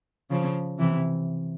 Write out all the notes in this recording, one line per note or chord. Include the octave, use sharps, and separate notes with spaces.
C#3 F3
C3 E3